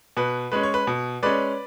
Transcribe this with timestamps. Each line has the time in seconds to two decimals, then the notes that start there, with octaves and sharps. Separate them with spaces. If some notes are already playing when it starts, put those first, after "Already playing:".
0.17 B2 B4
0.52 G#3 C#4 B4
0.63 C#5
0.74 B4
0.87 B2
1.23 G#3 C#4 B4 D5